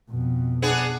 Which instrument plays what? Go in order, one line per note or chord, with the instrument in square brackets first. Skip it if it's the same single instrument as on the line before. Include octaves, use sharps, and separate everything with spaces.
[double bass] F2 B2
[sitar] B3 D4 G#4